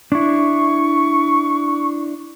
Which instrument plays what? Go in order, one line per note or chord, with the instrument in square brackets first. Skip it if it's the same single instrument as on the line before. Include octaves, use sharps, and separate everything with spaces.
[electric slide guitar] D4 E4 [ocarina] C#6